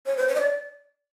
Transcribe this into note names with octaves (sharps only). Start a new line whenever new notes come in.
C#5
C5
C#5
D#5
D5